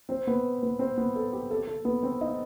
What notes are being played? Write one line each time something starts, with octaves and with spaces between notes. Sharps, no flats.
C4 C5
B3 B4
B3 B4
C4 C5
B3 B4
A4
G4
A4
A4
B3 B4
C4 C5
D#4 D#5